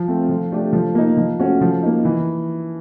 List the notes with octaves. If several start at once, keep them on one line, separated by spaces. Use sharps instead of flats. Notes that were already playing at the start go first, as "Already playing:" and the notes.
Already playing: F3
A3 C4
F3
A3 D4 G4
F3
A#3 D#4
F3
A3 C#4 F#4
F3
A#3 D#4
E3